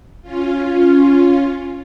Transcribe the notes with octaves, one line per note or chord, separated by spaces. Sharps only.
C#4 F4